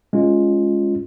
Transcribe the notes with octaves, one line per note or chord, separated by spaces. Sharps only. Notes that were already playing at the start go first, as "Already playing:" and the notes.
G#3 C#4 F4